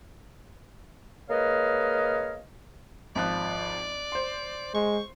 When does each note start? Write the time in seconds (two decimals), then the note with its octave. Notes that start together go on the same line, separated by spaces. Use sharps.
1.30 G#3 A#3 B4 C#5 D#5 F5
3.15 G#1 F3 D5 F#6
4.12 C5 C6
4.74 G#3 C#6